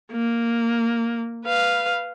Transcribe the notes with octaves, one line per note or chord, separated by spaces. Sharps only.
A#3
B4 F5